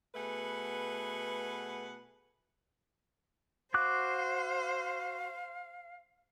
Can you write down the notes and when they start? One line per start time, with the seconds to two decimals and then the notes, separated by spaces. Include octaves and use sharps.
0.15 B2 A3 G#4 B4 F#5
3.74 F#4 C5 F5 D6 F#6